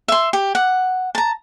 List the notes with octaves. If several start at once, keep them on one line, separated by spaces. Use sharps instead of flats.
E5 C6
G4
F#5
A5 A#5